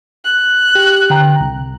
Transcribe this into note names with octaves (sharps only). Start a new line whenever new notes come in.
F#6
G4
D3 G5 A#5
C2